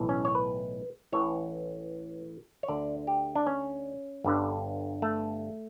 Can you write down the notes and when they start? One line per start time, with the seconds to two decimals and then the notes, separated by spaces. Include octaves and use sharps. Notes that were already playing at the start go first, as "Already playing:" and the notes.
Already playing: B1 A2 E3
0.09 C#4
0.25 C#5
0.35 B4
1.12 A1 A2 E3 C#5
2.63 C#5
2.68 D2 D3 D5
3.07 G4
3.35 D4
3.47 C#4
4.24 G1 G2 D3
5.02 A3